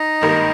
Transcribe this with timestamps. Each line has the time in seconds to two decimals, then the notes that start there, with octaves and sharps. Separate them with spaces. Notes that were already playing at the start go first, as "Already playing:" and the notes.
Already playing: D#4 D#5
0.21 G#1 G2 D#3 A#3